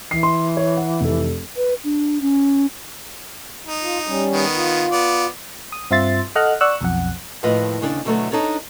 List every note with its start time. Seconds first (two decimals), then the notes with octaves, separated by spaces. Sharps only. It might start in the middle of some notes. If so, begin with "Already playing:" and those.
0.11 E3 C7
0.23 C6
0.57 C#5
0.77 F#5
1.01 F1 A4
1.57 B4
1.84 D4
2.21 C#4
3.67 D#4
3.82 F4
4.07 G3 C#4
4.32 D#3 B3
4.55 F4
4.91 B3 D5
5.72 D#6
5.91 G2 C4 F4 E5 C6 A6
6.35 A4 D#5 F#5 F6 F#6
6.61 D5 F#5 C#6 E6 F#6
6.81 B1 F2 F#5
7.43 D#2 A2 F3 F4 B4 D#5
7.81 D#2 C#3 D4 G#4 D5
8.05 B2 D3 F#3 A3 F#4 A4
8.31 D4 D#4 A4 C#5 D5